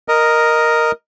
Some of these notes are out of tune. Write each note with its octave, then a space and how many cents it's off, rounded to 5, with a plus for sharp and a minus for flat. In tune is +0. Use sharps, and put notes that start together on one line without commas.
A#4 +0 D#5 -5